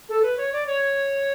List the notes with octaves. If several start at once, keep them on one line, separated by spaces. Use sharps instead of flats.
A4
B4
C#5
D5
C#5